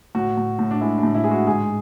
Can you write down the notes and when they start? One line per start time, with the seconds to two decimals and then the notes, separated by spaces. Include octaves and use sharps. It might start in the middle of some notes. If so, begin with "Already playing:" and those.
0.15 A2 F#4
0.37 A2
0.59 A2
0.71 D4
0.81 G#3 E4
0.98 D4
1.03 A2
1.15 E4
1.24 G#3 G#4
1.31 F#4
1.47 G#2 G#4